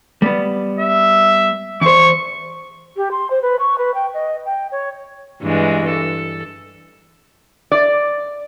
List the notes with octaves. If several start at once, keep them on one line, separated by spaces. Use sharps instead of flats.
G3 B3
E5
E2 C5 C#6
G4
C6
C5
B4
C#6
B4
G5
D#5
G5
C#5
G2 E3 G#3
A4
D5